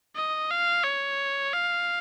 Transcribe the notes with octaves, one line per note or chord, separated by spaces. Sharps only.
D#5
F5
C#5
F5